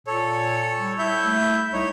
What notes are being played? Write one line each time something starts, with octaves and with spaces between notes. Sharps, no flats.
A#2 A4 C#5
G3
E4 E5 G6
A3
C2 D#4 C#5